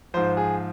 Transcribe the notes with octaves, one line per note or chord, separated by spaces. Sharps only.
G#2 F3 C5
G#4